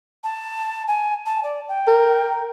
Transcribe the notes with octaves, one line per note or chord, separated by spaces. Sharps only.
A5
G#5
A5
D5
G5
A#4